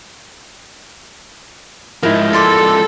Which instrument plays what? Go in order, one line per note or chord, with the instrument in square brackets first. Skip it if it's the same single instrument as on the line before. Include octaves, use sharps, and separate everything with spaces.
[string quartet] G#2 [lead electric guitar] F3 G#3 [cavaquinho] D#4 [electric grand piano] E4 A#4
[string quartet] A4 [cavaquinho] D5 C6 D6